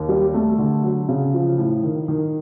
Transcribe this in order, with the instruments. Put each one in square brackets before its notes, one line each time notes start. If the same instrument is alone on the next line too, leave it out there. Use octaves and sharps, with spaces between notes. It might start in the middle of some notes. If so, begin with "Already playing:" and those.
Already playing: [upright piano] D#2
G3
A3
D3
F#3
C#3
F3
A2
D#3
D#3